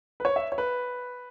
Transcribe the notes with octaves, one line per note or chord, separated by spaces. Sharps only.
B4
C#5
E5
C#5
B4